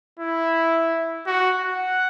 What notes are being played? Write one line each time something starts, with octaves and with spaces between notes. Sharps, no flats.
E4
F#4
F#5